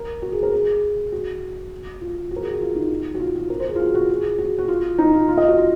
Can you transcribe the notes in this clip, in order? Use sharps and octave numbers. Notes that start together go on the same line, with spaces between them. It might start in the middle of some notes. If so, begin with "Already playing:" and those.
Already playing: A#4
F#4
G#4
A#4
G#4
F#4
F4
F#4
A#4
G#4
F#4
F4
D#4
F#4
F4
F#4
A#4
C5
G#4
F4
F#4
F#4
G#4
F#4
F#4
F4
D#4
F4
F4
D#5
F#4
F4